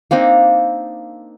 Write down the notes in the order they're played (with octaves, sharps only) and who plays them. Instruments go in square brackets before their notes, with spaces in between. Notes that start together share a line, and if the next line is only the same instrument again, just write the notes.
[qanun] A#3 C4 D4 D#4